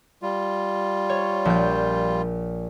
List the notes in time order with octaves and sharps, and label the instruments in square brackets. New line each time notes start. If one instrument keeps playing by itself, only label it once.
[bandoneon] G3 F4
[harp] C#5
A#1 G6